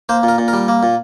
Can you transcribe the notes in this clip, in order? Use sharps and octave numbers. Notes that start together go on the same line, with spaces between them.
A#3 C5
A#2
A#4
A#2
A#4
G3
A#3
A#2